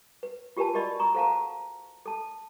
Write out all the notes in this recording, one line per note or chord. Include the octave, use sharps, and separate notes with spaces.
B4
F4 G4 A#4 B4 G#5 A5
F#4 G4 A#4 D5 D#5 B5
A#5 C#6 D#6
A4 C5 F5 F#5 A5 A#5
A4 A5